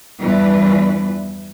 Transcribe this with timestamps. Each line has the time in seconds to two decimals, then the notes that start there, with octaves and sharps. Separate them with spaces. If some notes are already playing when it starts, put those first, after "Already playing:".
0.20 E2 G2 E3 F3 D4 B4